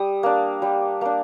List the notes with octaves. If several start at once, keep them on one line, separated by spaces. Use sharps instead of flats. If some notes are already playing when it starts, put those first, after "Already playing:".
Already playing: G3 D#6
A#3 D4
G3
A#3 D4